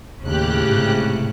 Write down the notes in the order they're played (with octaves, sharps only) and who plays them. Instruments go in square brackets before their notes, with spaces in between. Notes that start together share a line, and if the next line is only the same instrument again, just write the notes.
[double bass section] D#2 [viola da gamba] A2 C#3 [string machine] G4 F#6
[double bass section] G#2 C3